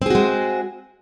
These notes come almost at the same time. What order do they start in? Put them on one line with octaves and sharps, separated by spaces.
C4 G#4 F#4 G#3